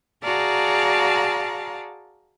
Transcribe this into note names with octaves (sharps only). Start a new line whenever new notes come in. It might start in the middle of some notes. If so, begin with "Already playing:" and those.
F#4 G#4 D5 F5 A5 A#5